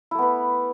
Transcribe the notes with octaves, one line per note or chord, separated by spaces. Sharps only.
A3 B3 E4 B4